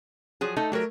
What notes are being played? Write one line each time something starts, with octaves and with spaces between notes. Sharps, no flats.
F3 F#3 G#4
A3 D#4 A4
F#3 A3 G4 A#4